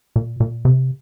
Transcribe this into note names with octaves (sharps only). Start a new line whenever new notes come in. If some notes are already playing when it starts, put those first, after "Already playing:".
A#2
A#2
C3